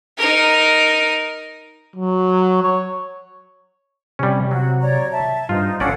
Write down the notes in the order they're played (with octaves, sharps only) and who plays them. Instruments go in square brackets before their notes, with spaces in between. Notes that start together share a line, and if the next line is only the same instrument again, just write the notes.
[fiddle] D#4 A#4
[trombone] F#3
C#5
[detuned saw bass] C3 [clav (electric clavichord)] G3 C#4
[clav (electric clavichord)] F#3 [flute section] F#4
[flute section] C#5 D5 A#5
E5 A5
[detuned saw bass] G2 [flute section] D#4 C5 [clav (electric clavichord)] F4
[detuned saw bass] A1 [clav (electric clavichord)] C#4 D4 D5 [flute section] A4 F5 F#5